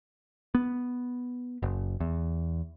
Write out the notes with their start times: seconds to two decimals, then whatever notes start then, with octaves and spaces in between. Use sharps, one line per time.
0.55 B3
1.63 F#1
2.00 E2